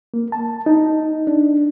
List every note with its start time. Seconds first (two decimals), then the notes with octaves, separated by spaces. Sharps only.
0.14 A#3
0.32 A5
0.66 D#4
1.27 D4